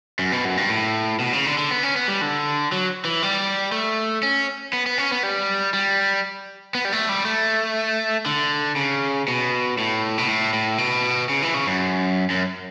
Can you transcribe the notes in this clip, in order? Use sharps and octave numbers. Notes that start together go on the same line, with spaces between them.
F#2
B2
F#2
G2
A2
B2
C#3
D3
D3
B3
C#4
B3
G3
D3
F#3
E3
G3
A3
C#4
B3
B3
C#4
B3
G3
G3
B3
G3
A3
G3
A3
D3
C#3
B2
A2
B2
A2
A2
B2
C#3
E3
C#3
F#2
F#2